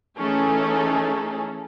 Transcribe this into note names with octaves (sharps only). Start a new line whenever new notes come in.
E3 A3 C#4 D#4 G#4 A4